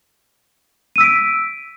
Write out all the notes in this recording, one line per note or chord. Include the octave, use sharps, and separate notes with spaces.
E6 B6 D7 D#7